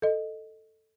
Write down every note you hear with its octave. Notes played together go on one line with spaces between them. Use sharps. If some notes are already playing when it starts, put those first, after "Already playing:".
A4 D#5